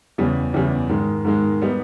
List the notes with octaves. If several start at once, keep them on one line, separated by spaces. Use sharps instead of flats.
E2 C#3 G3
E2 C#3 G3
G#2 D#3 G#3
G#2 D#3 G#3
G3 B3 D#4